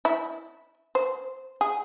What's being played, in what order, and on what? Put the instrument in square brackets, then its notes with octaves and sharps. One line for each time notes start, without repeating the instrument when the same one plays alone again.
[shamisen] E4
C5
G#4